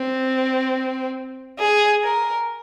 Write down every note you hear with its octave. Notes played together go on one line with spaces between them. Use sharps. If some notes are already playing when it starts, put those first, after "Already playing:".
Already playing: C4
G#4
A#4